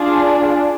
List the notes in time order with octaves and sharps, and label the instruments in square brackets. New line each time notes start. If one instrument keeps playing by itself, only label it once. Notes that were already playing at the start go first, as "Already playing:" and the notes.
Already playing: [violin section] D4 F4 G#4